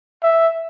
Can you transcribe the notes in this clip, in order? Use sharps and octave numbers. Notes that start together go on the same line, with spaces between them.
E5